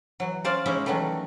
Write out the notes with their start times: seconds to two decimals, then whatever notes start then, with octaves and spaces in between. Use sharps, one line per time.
0.20 E3 F#3
0.44 C#4 C5 D5 F5
0.66 G#3 A#3 C#4 D#4 E4
0.86 D#3 E3 F#3 G3 A3